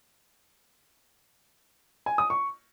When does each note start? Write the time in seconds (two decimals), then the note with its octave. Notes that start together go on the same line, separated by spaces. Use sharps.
2.06 G#5
2.18 D#6
2.30 C#6